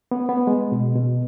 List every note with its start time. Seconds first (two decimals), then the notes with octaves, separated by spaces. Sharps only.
0.11 B3
0.29 B3
0.47 G#3
0.72 B2
0.96 B2